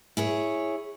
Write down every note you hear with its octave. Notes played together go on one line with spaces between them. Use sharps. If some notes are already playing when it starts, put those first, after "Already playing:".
E4 G#4 C#5